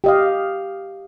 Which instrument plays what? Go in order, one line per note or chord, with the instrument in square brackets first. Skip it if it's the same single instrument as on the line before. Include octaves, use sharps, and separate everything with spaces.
[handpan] G4 D#5 F5